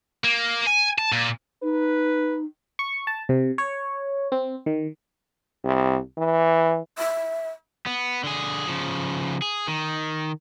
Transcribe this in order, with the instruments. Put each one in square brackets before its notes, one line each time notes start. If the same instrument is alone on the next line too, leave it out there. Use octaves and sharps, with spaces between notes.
[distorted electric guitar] A#3
G#5
A5
A#2
[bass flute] D#4 [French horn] B4
[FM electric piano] C#6
A5
C3
C#5
C4
D#3
[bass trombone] C2
E3
[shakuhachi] E5
[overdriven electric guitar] B3
D3 G#4
C#3 F3
G#4
D#3